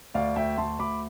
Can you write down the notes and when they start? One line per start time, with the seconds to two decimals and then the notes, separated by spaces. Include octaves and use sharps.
0.14 D2 D5 F5
0.36 D2 E5 G5
0.58 D2 A5 C6
0.79 D2 B5 D6